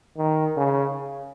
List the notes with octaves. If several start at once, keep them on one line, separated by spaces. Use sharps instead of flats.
D#3
C#3